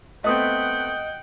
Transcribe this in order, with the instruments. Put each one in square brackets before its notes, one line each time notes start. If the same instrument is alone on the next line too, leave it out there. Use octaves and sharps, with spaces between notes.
[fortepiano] A3 B3 C4 [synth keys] D#5 D#6 [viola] F#5 G5